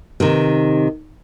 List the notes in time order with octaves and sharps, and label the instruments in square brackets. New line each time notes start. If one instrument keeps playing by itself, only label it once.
[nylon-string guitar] C3 D#3